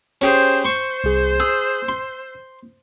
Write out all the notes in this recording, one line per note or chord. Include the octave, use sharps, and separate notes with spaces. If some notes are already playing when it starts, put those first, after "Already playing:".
C#4 G4 G#4 C5
C5 C6 C#6
C2 G#4
G#4 E6
C6